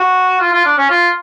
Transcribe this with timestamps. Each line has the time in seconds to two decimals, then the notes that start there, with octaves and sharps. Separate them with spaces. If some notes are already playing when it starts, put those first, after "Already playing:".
Already playing: F#4
0.41 F4
0.53 F4
0.65 D4
0.78 C#4
0.90 F4